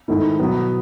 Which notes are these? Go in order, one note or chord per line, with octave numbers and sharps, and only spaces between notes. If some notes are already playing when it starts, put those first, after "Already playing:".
G#2 D#3 A3 E4
B2 F#3 B3 F#4